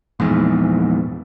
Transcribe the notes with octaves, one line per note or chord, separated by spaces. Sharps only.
A#1 E2 G#2